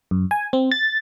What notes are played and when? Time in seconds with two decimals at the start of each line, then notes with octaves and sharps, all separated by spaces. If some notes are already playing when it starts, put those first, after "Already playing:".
0.11 F#2
0.31 G#5
0.53 C4
0.71 A6